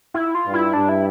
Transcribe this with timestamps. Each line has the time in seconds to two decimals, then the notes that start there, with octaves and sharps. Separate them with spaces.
0.14 E4
0.35 F4
0.44 G2
0.53 E4
0.73 G2 D4
0.89 E4